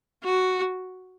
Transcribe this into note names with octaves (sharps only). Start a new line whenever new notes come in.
F#4